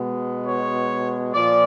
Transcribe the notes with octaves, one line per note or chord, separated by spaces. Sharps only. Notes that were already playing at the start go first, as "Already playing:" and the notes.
Already playing: B2 G#3 B3
C#5
A#2 F3 D5